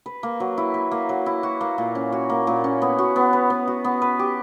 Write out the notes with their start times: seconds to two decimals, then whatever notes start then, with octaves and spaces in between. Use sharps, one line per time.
0.06 B4
0.23 A#3
0.40 F#3
0.58 E4
0.74 B4
0.91 A#3
1.09 F#3
1.26 E4
1.43 F#4
1.61 A#3
1.78 A#2
1.95 C#4
2.12 F#4
2.30 A#3
2.47 A#2
2.64 C#4
2.82 B3
2.99 F#4
3.16 B3
3.33 B4
3.50 B3
3.68 F#4
3.84 B3
4.02 B4
4.19 G4